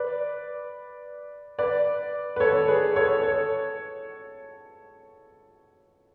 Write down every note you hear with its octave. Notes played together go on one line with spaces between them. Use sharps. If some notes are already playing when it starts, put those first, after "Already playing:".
Already playing: B4 D5
B4 D5
B4
A4 C#5
G#4 B4
A4 C#5
A4 C#5